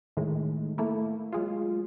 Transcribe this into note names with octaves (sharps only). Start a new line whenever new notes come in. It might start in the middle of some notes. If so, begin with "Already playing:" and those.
A2 D#3 G#3
A3 A#3 E4
F#3 G#3 F4